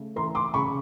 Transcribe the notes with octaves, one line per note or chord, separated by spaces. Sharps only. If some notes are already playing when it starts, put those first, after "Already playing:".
Already playing: C#3 A3
E3 A#5 C6
C6 D6
C#3 B5 C#6